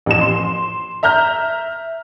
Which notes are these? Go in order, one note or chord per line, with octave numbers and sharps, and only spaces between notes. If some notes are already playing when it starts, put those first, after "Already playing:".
A1 F2 E7
C6
E5 A#5 F6 G6